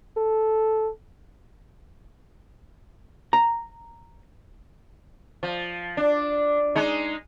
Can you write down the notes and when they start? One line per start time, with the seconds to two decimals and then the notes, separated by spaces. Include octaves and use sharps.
0.17 A4
3.33 A#5
5.43 F3
5.97 D4
6.76 G#3 D#4